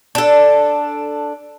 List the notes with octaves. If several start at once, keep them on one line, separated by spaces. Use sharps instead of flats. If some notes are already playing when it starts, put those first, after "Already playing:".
D4 A4